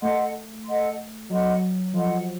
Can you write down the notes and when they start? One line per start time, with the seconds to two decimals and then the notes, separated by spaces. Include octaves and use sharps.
0.02 A3 A4 D#5 F#5 C6
0.66 A4 D#5 F#5 C6
1.30 F#3 A4 D#5 F#5 C6
1.94 F3 A4 D#5 F#5 C6